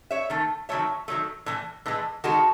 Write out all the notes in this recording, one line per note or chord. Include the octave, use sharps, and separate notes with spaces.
C#5 E5
D#3 A3
D#3 F#3 A3 C#5 E5
D#3 F#3 A3
A2 E3
A2 E3 G#3
D#3 G#3 F#4 A4